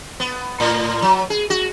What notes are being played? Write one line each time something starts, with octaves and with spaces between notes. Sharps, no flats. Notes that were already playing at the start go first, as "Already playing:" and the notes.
B3
A2
F#3
G#4
F#4